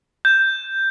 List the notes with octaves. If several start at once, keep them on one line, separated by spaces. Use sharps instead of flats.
G6